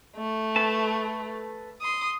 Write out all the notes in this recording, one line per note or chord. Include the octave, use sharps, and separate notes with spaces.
A3
A4 B4 A5
C6 D#6